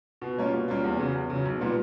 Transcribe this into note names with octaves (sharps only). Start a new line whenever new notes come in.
B2
G3 A#3 C#4 F4
B2
G3 A#3 C#4 F4
E2
C#3 F#3
E2
C#3 F#3
B1
A#2 G3 B3